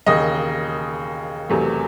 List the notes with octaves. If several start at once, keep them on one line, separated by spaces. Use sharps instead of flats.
E1 D#2 C#3 D#5
E1 E2 C3 F#3 A3